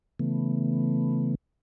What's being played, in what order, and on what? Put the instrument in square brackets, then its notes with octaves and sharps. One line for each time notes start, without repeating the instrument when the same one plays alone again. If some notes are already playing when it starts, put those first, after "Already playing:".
[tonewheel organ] C#3 E3 A3 B3